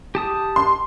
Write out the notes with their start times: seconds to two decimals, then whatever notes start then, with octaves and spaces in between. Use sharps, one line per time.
0.15 G4 A5 D#6
0.56 C6